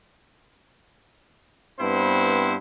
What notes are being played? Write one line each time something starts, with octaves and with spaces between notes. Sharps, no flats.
G2 B3 C4 E4 C5